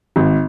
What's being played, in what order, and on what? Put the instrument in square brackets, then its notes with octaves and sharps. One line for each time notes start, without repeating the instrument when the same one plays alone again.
[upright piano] G#1